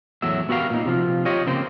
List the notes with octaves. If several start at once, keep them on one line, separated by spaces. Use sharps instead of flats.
E2 A2 F#3 E5
B3 F#4 G4 A#4 F5
A#2 D#4
C3 F3 F4
F4 G4 C#5 D#5
C#3 A#3 C4 C5